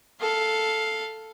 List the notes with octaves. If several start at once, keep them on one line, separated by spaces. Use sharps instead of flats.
A4 F5